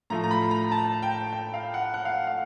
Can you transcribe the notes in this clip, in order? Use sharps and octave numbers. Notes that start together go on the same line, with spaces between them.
A2 F3 A3 A#5
A#5
B5
A#5
A5
G5
G5
F5
F#5
F#5
F5
F5